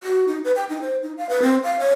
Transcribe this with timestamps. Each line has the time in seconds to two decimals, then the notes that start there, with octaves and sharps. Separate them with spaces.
0.03 F#4
0.28 D#4
0.44 B4
0.56 G5
0.69 D#4
0.82 C5
1.03 D#4
1.17 F5
1.29 B4
1.42 C4
1.63 F5
1.80 C#5